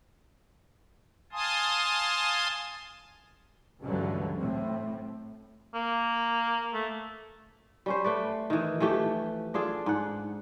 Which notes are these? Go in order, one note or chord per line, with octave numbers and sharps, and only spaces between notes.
F5 G#5 A5 C6 D#6
C#2 G2 D3 E3 F#3
A2 C4
A#3
A3
G3 C#4 C5
A3 B4 D5
D#3 E3
E3 F3 A3 G4
D4 F4 G#4 A4
G#2 F#5